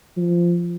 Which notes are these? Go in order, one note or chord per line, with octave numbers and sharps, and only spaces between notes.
F3